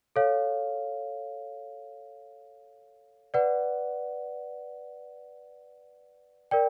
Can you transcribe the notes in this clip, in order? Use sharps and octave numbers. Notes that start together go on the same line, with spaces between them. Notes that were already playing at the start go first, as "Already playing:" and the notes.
A4 C#5 F5
B4 D5 F#5
A#4 D5 G5